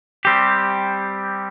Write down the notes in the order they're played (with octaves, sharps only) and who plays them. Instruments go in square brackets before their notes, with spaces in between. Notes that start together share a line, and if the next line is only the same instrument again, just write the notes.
[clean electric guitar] G3 C4 G4